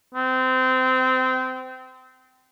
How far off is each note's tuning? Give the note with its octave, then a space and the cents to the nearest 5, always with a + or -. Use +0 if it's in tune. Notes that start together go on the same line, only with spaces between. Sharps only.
C4 -25